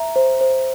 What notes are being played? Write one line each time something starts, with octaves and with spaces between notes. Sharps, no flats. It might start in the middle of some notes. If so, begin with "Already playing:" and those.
Already playing: E5 A#5
C5
C5